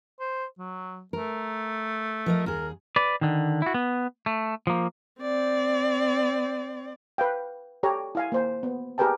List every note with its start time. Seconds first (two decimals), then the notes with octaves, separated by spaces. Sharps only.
0.20 C5
0.58 F#3
1.13 A3 A#4
2.26 F3 A#4 D#5
2.46 D#2 G#4 A#4
2.96 B4 D5
3.21 D3 D#3
3.62 E4 F#4
3.74 B3
4.26 A3
4.67 F3 A#3
5.21 C4 D5
7.18 B4 F5 G5
7.83 G4 A4 C#5 A#5
8.15 E4 F5 G#5
8.32 A#3 C5
8.63 B3
8.98 G4 G#4 A#4 B4 G5 A5